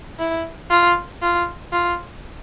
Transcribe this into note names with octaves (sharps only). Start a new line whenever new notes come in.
E4
F4
F4
F4